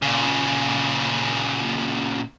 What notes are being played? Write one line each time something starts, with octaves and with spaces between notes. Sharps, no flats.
A#2 C#3